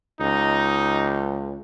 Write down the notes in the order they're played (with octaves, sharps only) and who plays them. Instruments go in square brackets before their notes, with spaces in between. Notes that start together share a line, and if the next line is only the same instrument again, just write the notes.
[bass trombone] C#2 [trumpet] D#4